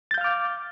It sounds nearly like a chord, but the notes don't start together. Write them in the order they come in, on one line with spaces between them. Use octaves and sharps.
A6 G6 F5 F6 D6